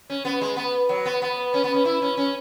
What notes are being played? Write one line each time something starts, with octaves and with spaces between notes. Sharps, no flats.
C#4
B3
G#3
B3
F#3
B3
B3
C#4
B3
C#4
E4
C#4
C#4